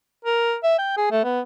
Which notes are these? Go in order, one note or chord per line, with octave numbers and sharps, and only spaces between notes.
A#4
E5
G5
G#4
A3
B3